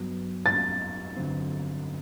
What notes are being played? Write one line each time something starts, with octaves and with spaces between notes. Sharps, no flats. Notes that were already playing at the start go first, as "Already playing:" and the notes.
Already playing: G2 F#3 B3
A6
G2 D3 F#3 C4